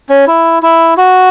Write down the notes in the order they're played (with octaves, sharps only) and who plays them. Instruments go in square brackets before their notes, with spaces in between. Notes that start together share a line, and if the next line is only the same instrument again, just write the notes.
[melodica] C#4
E4
E4
F#4